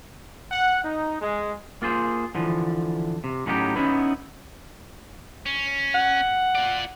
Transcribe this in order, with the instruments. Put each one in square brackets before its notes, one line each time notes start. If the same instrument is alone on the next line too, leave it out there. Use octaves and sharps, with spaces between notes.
[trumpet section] F#5
D#4
G#3
[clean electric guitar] A#3 F4 G#4 C5
D3 E3 F3
C3
A2 F#3 C#4 D#4 E4 G4
B3 C#4 D#4 E4 B4
[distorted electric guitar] C#4
[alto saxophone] F#5
[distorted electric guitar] F4 D5